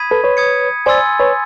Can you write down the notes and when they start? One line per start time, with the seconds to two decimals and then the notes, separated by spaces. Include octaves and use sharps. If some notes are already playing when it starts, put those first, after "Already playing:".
Already playing: B5 D#6 G#6 B6 D#7
0.11 A4 B4
0.24 B4 C#5
0.37 D#6 G#6 C#7
0.86 C5 D5 G#5 C6 E6 A6
1.20 B4 C#5